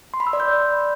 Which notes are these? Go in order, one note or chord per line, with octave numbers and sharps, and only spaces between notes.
C6
B5
E6
D5
G6